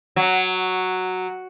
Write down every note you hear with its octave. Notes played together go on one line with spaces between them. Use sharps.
F#3